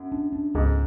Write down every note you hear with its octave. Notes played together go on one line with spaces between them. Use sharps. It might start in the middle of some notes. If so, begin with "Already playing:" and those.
Already playing: F#2
D4
D4
C#2 G#2